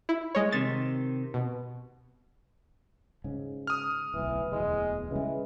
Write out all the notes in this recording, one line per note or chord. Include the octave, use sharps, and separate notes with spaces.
E4
G#3 C#5
C3 D#3 A6
B2
G#2 C#3
D#6 F6
D1 B1 E3
D1 E2 B2 G#3
C#3 E3 G#3